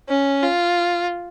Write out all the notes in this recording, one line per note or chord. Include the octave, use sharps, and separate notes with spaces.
C#4
F4